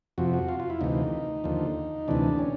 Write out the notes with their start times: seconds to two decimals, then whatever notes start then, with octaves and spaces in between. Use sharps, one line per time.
0.18 F2 C3 F3 F#4
0.34 F#4
0.48 F4
0.60 F4
0.70 E4
0.81 D2 C3 E3 D#4
1.44 D#2 D3 F3
2.08 D2 C3 E3 D4
2.39 C#4